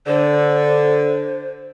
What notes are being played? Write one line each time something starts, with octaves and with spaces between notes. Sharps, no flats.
D3 C5